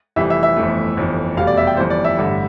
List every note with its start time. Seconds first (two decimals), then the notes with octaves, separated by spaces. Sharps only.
0.16 F1 F2 E3 G3 E5
0.30 E5
0.43 E5
0.56 G1 F2 E3 A3
0.97 G1 F2 E3
1.37 F1 E2 B2 G3 F5
1.47 D5
1.57 E5
1.67 G5
1.77 G1 F2 E3 G3 C5
1.90 D5
2.04 E5
2.17 A1 G2 D3